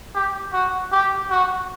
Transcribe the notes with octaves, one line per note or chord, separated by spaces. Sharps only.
G4
F#4
G4
F#4